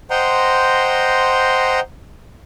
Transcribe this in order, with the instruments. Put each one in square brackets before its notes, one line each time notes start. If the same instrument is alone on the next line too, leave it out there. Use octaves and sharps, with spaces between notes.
[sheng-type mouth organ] C5 D#5 F#5 G5 A#5 C6